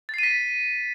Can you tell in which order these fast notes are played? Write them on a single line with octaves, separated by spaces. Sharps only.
A6 C7 D#7 B6